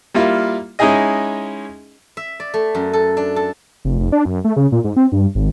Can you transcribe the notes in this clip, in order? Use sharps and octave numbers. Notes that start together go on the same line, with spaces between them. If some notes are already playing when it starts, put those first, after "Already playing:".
G3 A#3 E4 F4
G#3 C#4 D#4 E4 G#4 D#5
E5
D5
A3
F#2
A4
D4
A4
F1
F1
D4
F#2
A3
C#3
A#2
G#2
C4
G2
G#1